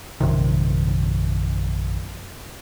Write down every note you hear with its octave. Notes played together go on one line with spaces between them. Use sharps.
A#1 F#2 C3 D#3